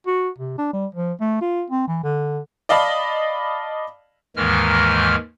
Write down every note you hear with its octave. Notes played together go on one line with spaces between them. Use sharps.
F#4
C3
D4
G3
F3
A3
F4
C4
E3
D3
D5 D#5 F5 A5 B5
D#2 G#2 D#3 E3 G#3 F6